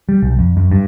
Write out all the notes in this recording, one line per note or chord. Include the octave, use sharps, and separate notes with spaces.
G3
B1
F2
F#2
G2